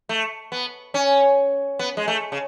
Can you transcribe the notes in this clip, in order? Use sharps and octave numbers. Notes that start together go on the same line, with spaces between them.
A3
B3
C#4
B3
G#3
A3
C#3